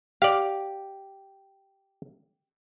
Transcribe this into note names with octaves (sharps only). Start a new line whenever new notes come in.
G4 D5 F5